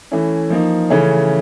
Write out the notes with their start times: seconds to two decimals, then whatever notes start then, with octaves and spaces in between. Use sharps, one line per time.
0.11 E3 A3 C#4 E4
0.50 F3 A#3 D#4
0.90 C#3 E3 A3 C#4